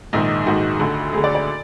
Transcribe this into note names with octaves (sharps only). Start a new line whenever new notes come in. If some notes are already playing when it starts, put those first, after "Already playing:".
A#1 G#2 D#3 D#4
A#1 G#2 D#3 F#4
D2 D3
D2 D3 G#4
D5
D5